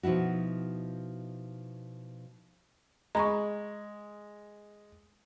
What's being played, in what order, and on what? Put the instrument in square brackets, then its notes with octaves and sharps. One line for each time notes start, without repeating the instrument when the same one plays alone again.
[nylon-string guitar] B2 F3 D#4 E4 F#4
[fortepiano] G#3 [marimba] A#5 B5 C#6